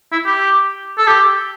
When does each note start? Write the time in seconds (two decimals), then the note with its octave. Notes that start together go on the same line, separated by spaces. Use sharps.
0.12 E4
0.26 G4
0.98 A4
1.07 G4